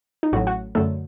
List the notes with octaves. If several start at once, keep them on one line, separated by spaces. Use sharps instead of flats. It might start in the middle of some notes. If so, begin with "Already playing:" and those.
D#4
A1 A2 F#3 F#4
F#4
F#2 D3 F#3 A3 A4